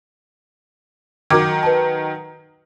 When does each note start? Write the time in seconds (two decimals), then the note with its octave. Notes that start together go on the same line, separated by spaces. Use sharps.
1.30 D#3 F#3 A#4 D6 G#6
1.63 B4 A5